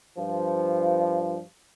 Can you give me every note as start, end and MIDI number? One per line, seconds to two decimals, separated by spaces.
0.17 1.39 43
0.17 1.39 53